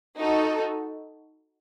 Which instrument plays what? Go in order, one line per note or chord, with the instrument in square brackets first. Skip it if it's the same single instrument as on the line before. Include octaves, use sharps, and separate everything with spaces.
[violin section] D#4 F#4 A4